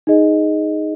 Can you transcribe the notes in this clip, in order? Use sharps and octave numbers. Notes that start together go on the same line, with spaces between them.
D#4 G#4 D#5